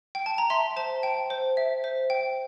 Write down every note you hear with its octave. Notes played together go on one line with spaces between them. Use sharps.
G5
A5
A#5
E5 C6
C5 A5
G5
C5
E5
C5
G5